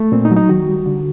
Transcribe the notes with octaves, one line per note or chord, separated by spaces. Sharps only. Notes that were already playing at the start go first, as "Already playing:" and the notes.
Already playing: A3
A#2 C4
D#4
F#3
D#4
D#3 F#4
G3
D3